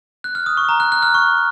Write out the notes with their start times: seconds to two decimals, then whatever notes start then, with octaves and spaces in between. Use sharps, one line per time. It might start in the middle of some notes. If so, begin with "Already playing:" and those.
0.24 F#6
0.35 F6
0.46 D#6
0.57 C#6
0.69 A#5
0.80 F#6
0.92 F#6
1.03 F6
1.14 C#6